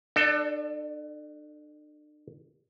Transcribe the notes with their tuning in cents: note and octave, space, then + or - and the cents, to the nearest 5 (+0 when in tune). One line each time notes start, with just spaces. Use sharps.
D4 +40 A4 +15 D5 -5